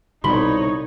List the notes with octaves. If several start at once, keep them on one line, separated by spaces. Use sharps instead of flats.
C2 B2 D3 G3 D#4 C#5 B5 C6